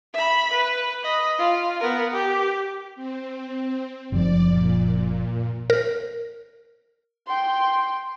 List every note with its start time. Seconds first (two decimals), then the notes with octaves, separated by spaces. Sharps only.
0.14 E5 B5
0.53 B4
1.03 D#5 B5
1.39 F4
1.80 B3 A#4
2.12 G4
2.96 C4
4.12 F#1 F3 D5
4.46 A#2
5.70 A#4
7.27 G5 C6